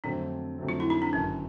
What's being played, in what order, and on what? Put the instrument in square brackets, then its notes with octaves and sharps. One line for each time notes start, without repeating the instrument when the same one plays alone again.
[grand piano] F2 D3 F#3 A3 C4 [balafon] D4
[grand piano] F2 D3 F#3 A3 C4
[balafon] F4
E4
D#4
D4
[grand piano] G1 F#2 D#3 [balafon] C#4